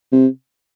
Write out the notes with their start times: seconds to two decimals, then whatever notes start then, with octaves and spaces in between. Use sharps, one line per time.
0.12 C3